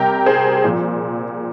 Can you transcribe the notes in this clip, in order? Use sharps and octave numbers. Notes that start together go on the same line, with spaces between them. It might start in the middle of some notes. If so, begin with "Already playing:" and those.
Already playing: C3 G3 G4 A#4
G#4 C5
A#2 F3